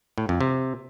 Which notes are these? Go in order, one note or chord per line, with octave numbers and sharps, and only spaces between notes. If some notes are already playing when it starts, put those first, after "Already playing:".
A2
F2
C3